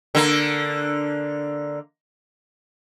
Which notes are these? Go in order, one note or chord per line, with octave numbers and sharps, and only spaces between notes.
D3 A#3